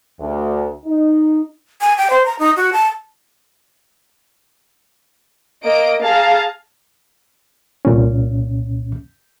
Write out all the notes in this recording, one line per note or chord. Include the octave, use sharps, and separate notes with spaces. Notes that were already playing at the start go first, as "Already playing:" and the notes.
D2
D#4
G#5
G5
C5
A#5
D#4
F#4
A5
A#3 D#5 D7
G#4 F5 A5 A#5
C2 A#2 C#4